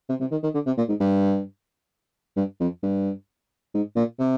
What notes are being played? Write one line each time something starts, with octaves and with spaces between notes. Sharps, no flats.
C3
C3
D#3
D#3
D3
C3
A#2
G#2
G2
G2
F2
G2
G#2
A#2
C3